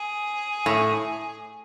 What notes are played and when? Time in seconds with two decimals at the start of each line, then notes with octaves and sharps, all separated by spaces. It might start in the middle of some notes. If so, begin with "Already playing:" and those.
Already playing: G#4
0.66 A2